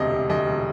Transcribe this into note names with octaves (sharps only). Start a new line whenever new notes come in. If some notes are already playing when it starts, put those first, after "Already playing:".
Already playing: E1 D2 C3 D#5
C3
D2 D#5
E1